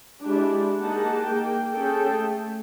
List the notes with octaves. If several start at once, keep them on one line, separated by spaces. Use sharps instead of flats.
G#3 D4 E4 G4
A#3 D#4 G#4 F#5 A5
A#3 G5
C#4 G#4 A4 G5
A3